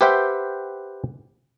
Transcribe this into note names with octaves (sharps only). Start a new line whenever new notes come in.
G4 B4 C5 E5 F#5 G5